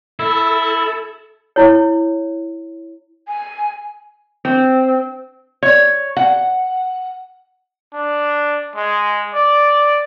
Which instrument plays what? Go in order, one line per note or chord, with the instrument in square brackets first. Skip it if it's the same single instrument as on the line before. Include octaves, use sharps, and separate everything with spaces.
[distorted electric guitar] E4 [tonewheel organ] A4
[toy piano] E4 C#5
[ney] G#5
[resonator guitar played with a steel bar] C4
C#5
F#5
[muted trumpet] D4
G#3
D5